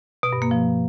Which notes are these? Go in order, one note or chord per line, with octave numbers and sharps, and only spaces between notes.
B2
G2
A#3
F3